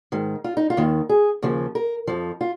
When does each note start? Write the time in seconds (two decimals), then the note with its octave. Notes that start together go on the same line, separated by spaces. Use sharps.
0.12 G#2 D#3
0.44 F4
0.57 D#4
0.70 F4
0.77 D#2 D#3
1.09 G#4
1.42 D#2 C#3 F3
1.75 A#4
2.07 F2 F3
2.41 F4